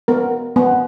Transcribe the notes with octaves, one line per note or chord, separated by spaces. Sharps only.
B3 A#4
B3